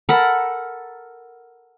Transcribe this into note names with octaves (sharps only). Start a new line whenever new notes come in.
A4 A#4 F#5 B5